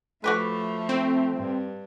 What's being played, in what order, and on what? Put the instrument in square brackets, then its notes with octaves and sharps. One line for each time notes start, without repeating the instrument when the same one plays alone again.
[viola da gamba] F3 [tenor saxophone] A3 [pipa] F#4 G4 B4
[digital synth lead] C4
[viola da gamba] G2